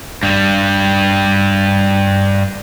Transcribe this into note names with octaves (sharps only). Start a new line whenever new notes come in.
G2 G3